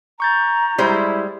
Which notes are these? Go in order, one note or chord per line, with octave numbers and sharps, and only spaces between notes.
A#5 C#6 G6 A6
G3 G#3 E4 C5